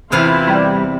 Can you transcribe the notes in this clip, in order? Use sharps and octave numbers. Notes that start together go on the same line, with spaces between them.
E2 C3 E4 F4 F5
G3